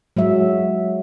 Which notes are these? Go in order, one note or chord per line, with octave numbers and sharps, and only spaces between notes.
F#3 G#3 E5